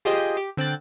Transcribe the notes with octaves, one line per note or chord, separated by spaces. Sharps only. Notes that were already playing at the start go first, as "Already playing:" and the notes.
F4 G4 G#4 C5 D#5 G5
G4
D3 C4 G5 F#6 A6